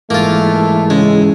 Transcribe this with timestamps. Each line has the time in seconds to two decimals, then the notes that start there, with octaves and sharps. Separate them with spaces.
0.10 G#2 E3 A3 A#3 F4
0.90 C#3 G#3